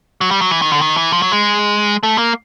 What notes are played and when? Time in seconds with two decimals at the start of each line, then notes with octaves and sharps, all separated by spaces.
0.21 F#3
0.31 G3
0.41 F#3
0.51 E3
0.62 D#3
0.72 D3
0.81 D#3
0.97 E3
1.13 F3
1.22 F#3
1.32 G#3
2.03 A3
2.18 A#3